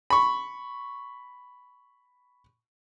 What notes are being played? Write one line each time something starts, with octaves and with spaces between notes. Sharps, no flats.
B5 C#6